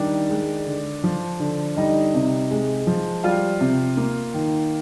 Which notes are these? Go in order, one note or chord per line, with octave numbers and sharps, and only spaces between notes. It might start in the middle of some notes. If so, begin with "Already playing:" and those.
Already playing: D#3 G3 D4 D5
G#3
D3
F3
D3
G3 D#4 D#5
C3
G#3
F3
G3 F4 F5
C3
A#3
D#3